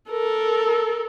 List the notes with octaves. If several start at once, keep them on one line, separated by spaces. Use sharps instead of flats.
A4 A#4